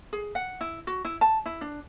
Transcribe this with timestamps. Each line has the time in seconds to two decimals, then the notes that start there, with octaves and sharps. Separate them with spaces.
0.13 G#4
0.35 F#5
0.61 E4
0.87 F#4
1.05 E4
1.21 A5
1.46 E4
1.61 D4